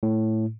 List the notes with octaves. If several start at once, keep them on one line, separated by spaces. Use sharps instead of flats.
A2